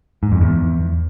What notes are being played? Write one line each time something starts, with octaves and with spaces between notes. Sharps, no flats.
G#2
F2
E2